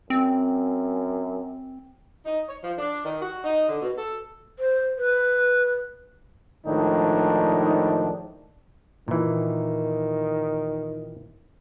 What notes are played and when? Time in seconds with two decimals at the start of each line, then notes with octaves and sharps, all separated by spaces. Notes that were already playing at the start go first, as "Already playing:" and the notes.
0.10 F#2 C4
2.26 D#4
2.48 C#5
2.63 F3
2.78 D4
3.05 D#3
3.21 F#4
3.44 D#4
3.69 D3
3.82 B2
3.98 A4
4.59 C5
4.98 B4
6.67 A2 D#3 F3 G#3 D4 D#4
9.08 A#2 D#3 E3